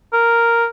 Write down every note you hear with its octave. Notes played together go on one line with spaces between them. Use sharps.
A#4